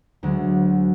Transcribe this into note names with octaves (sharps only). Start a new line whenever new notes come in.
D2 F#3 G#3